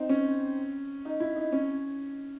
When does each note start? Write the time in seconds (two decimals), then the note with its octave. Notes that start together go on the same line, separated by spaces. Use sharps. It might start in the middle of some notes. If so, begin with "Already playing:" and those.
Already playing: C4 D#4
0.09 C#4
1.05 D#4
1.20 E4
1.36 D#4
1.52 C#4